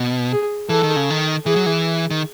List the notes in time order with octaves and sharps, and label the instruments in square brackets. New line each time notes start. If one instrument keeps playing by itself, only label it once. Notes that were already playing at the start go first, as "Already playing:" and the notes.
Already playing: [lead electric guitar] B2
[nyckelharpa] G#4
[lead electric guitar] E3 [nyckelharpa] A4
[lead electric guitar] D#3
C#3
D#3
[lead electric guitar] E3 [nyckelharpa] G#4
[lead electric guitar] F#3
E3
D#3